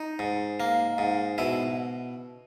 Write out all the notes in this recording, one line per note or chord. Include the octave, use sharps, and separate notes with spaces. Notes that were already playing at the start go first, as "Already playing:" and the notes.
Already playing: D#4
G#2
A#3
G#2
B2 E4